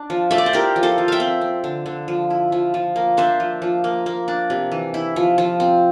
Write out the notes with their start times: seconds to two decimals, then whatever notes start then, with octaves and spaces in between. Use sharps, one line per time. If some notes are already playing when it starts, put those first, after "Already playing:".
Already playing: D4
0.10 F3
0.31 A3 E5
0.38 D5
0.46 C5
0.53 E4 G4 A#4
0.76 F3
0.83 A4 C5
0.98 F3
1.08 E5 F5 G5
1.20 C4
1.41 C4
1.64 D3
1.86 D3
2.08 F3
2.30 E4
2.52 F3
2.74 F3
2.96 A#3
3.17 D4 C5 E5
3.40 F3
3.62 F3
3.84 A#3
4.06 A#3
4.28 D4
4.50 C3
4.72 E3
4.94 E4
5.16 F3
5.38 F3
5.60 C4